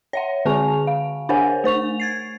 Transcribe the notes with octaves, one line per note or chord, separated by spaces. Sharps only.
C#5 E5 F#5
D3 C4 G#4 G#5 C#6 F7
F5
D4 A#4 C5 C#5 F#5 G#5
A3 C5 C#6 F7
G#6 A6 C7